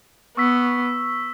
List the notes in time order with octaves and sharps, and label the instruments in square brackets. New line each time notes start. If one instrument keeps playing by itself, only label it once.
[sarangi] B3 [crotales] C#6 E6 B6